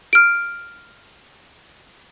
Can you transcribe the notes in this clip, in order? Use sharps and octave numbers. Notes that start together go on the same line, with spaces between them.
F6 D7